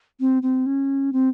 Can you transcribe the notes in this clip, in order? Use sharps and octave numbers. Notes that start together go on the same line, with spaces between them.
C4
C4
C#4
C4